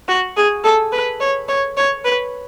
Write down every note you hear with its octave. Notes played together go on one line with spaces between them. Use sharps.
F#4
G#4
A4
B4
C#5
C#5
C#5
B4